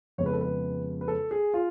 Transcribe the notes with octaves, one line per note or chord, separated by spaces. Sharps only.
F2 C#3 G#3 B3 C#5
B4
A4
B4
B4
A4
G#4
F4